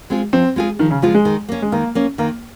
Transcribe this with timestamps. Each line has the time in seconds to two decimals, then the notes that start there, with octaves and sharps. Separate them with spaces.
0.10 G#3 C4 F4 G#4
0.33 F3 C4
0.56 G#3 C4 F4 G#4
0.79 D#3 F3
0.91 C#3
1.02 F3 G#3 C4 F4 G#4
1.15 G#3
1.25 D#3
1.48 A#3 C#4
1.62 G#3
1.72 D#3 A#3
1.95 A#3 C#4
2.18 D#3 A#3